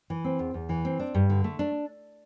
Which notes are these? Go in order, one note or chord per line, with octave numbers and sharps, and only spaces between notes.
E3
C4
E2
E2
E3
C4
D4
G2
D3
A3
D4